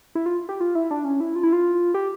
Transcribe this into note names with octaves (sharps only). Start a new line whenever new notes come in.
E4
F4
G4
F4
E4
D4
C#4
E4
F4
E4
F4
G4